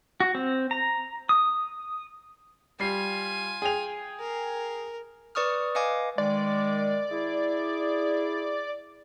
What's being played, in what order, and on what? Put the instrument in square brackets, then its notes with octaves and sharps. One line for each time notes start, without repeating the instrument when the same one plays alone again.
[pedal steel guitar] F#4
C4
A#5
D#6
[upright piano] G3 C7 [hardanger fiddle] F4 G#5
[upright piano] G#4 G5 F7
[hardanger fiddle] A#4
[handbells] B4 D5 C#6 D#6 F6
B4 D#5 F5 G#5 D6
[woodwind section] D#3 G#3 [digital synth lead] D5
[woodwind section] E4 G#4